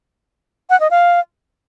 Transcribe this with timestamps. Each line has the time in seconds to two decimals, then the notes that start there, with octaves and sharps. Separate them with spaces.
0.70 F#5
0.80 D#5
0.91 F5